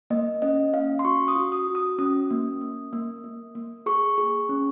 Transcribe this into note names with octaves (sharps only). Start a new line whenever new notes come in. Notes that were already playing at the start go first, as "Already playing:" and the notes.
A#3 D#5
C#4 D#5
C#4 F5
C6
F#4 C#6
D#6
F#4
D#6
F#4
D#6
C#4 D#6
A#3
A#3
A#3
A#3
A#3
G#4 C#6
G#4
C#4